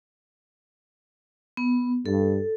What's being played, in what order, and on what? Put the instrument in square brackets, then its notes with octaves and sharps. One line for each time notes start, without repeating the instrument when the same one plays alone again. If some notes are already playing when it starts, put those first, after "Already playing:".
[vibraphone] B3
[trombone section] G2 [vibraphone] A4